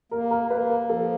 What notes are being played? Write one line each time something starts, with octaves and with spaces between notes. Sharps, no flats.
A#3 A#4
A#4
A#3 B4
A#4
F3 A4